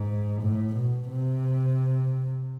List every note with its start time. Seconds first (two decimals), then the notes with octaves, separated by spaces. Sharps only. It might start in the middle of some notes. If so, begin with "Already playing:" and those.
Already playing: G#2
0.43 A2
0.76 B2
1.10 C3